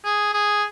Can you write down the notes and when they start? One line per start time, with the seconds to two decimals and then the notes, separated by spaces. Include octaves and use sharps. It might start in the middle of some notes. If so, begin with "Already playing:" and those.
0.04 G#4
0.33 G#4